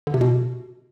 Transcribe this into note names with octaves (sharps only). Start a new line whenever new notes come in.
D3
C3
B2